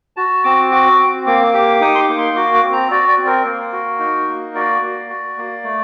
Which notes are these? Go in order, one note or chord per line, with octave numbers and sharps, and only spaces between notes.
F#4 A5
C4 D6
F#4 D6
C4
A#3 D6
G4 D6
D#4 D#6
C6
D6
A#3
C6
F#4 D6
D6
C4
A#5
F#4 D5
D5
C4
A#4
A#3
F#4
D#4
A#3
F#4 D5
A#3
F#4
A#3
A3